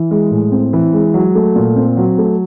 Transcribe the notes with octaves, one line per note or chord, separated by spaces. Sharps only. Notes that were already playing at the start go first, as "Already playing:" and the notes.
Already playing: E3
G#3
A2
C4
E3
G#3
F#3
A3
A#2
C4
F#3
A3